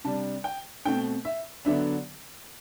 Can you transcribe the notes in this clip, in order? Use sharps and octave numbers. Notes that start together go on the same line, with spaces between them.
C3 G3 D4 A5
G5
B2 A3 C4 G5
E5
D3 F#3 B3 D4 E5